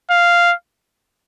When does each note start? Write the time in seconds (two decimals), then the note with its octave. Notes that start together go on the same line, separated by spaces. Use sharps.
0.11 F5